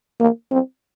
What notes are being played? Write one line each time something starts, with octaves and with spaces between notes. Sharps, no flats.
A#3
C4